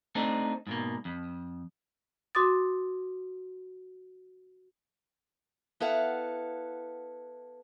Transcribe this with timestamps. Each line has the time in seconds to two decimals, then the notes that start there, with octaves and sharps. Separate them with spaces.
0.15 A3 C4 D4 D#4
0.67 G#2 B2 A#3
1.05 F2
2.35 F#4 C6 D6 D#6 A6
5.80 B3 E4 A4 F5 F#5